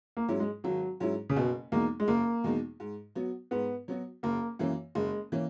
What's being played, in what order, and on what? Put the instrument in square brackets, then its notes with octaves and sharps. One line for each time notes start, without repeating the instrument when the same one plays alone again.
[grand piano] A#3
[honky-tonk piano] G#2 F#3 C#4 E4
[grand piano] G#3
[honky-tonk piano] G#1 [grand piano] F#3
[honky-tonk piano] G#2 F#3 C#4 E4
[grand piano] C#3
[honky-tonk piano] F#1 [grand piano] B2
[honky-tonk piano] E2 B2 G#3 D#4 [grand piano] A#3
[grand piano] G#3
[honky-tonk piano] F#1 [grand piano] A#3
[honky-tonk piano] E2 B2 G#3 D#4
G#2
F#3 B3 F#4
[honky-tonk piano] G#2 [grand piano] B3
[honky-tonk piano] F#3 B3 F#4
[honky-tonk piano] F#1 [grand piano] A#3
[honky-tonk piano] F#2 E3 A#3 C#4
[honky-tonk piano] F#1 [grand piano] G#3
[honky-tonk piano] E3 A#3 C#4